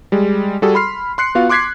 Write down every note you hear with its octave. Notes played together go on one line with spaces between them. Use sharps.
G3 G#3
G3 F#4 G#4 A4
B5 C6 F6 C7
C6 F#6 C7 C#7
B3 F4 F#4 F5
C6 D6 F#6 G#6 B6 C7